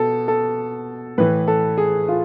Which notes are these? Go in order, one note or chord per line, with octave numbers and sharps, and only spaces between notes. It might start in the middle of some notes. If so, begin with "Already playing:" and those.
Already playing: B2 A4
A4
A2 E3 B4
A4
G#4
F4